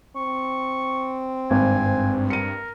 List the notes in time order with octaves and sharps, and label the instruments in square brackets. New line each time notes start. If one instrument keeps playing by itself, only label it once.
[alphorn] C4 [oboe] C#6
[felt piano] G#1 [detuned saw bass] G2 [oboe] G#5
[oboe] A#4 [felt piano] C#7 D#7